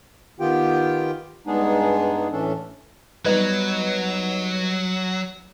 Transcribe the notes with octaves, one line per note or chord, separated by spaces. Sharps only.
D#3 B3 F4 G4 G5
G2 G#3 B3 D4 D#4 G#4
A2 E3 C#4 D4 A4
F#3 G3 B3 D#4 B4 G#6